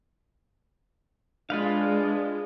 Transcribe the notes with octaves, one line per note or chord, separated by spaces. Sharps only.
G#3 D4 F4 B4 F5